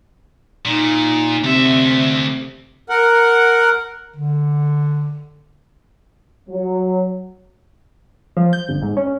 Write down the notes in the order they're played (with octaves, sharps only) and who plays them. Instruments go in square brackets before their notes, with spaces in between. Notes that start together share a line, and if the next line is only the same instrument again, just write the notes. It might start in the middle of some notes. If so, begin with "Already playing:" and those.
[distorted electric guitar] A#2 [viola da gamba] D#4
[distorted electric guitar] D2 E5 [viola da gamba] C3
[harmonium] A#4 F#5
[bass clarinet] D3
[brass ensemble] F#3
[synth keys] F3
G6
G1
G#2
C#4